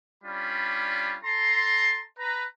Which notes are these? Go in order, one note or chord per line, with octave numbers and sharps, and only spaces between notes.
G3 C#4 D4 F4 B5
A4 A5 A#5 C6
B4 A#5